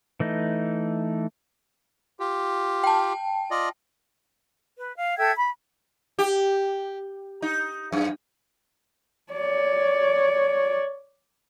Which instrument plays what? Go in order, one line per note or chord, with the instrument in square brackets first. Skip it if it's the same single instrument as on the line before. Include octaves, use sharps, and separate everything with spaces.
[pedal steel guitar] E3 A3 D#4
[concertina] F4 G4
[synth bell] G5 A5
[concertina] F4 D5 D#5
[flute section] B4
F5
A4 E5 G5 G#6
B5
[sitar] G4
D#4
F#2
[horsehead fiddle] C#5 D5